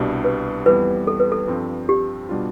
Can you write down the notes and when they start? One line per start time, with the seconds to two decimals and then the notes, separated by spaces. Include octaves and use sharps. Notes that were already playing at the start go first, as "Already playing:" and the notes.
Already playing: C2 B2 G3 D4
0.24 B4
0.66 F2 E3 G3 B3 B4
1.07 A4
1.20 B4
1.32 A4
1.47 G2 F3 C4
1.89 G4
2.29 B2 G3 D4 F4